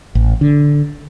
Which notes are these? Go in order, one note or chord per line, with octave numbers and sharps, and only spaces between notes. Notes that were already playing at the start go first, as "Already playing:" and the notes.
A1
D3